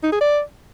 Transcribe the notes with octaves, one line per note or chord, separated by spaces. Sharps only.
D#4
G#4
D5